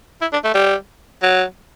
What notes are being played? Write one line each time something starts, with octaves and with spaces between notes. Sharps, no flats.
E4
D4
A3
G3
F#3